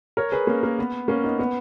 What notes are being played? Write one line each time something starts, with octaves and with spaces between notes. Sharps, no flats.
A#4 C#5
G#4 B4
A#3 C#4
A#3
B3
A#3 C#4
B3 D#4
B3